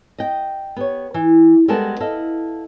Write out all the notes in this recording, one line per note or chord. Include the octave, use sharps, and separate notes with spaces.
D#5 G5
B3 G4 C#5
E3
G3 G#3 B3 A4 A#4 A5
E4 A4 D#5 F5